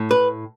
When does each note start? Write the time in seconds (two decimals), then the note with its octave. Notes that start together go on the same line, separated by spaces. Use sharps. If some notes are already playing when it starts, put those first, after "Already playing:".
Already playing: A2
0.11 B4